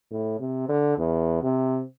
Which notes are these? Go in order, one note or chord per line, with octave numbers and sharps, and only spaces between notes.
A2
C3
D3
E2
C3